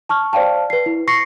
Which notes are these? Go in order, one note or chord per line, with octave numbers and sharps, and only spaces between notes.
A5 C#6 F6
C5 D5 F5 G5 A5
B4 C7
E4
C#6 A#6 C7 C#7